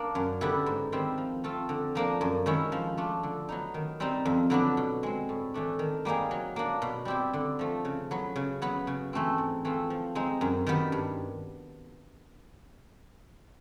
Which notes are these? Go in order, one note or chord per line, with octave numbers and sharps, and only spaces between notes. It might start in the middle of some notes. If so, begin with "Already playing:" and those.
Already playing: A#3 D4
F#2
D3 G3 B3 E4
G#2
D#3 G3 C4 E4
F3
A3 C4 F4 A4
D3
F3 A#3 D4
F#2
D#3 G#3 C#4 E4
F3
A3 D4 F4
D3
F#3 B3 D#4
D#3
G3 C4 D#4
F2
D3 F#3 B3 D4
B2
G#3 C4
A2
E3 A3 D4
D#3
G3 A#3 D#4 G#4
F#3
A#3 D4
B2
G3 C4 E4 G4
D3
F3 A3
C#3
F#3 B3
C#3
F#3 B3
C#3
E3 A3 C4
G#2
E3 A3 C4 F4
F3
G#3 C4 D#4
F#2
D#3 G3 B3
G2